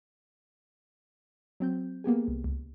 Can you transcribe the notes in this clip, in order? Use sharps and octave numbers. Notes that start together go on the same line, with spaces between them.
F#3 C4 G6
A#3 B3 G4 G#4
C2
C#2